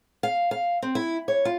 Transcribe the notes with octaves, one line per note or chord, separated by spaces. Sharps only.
F5
F5
C4
E4
C#5
F4